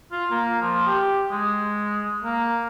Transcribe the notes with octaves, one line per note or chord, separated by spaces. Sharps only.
F4
A#3
F3
G4
G#3
A#3